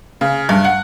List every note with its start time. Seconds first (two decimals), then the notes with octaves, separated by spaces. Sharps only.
0.21 C#3
0.49 G2
0.64 F#5